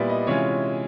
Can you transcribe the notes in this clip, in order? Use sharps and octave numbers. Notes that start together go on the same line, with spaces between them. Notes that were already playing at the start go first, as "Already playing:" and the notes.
Already playing: A#2 G3 B3 E4 D5
D#5
C3 E3 G#3 C#4 F4 C#5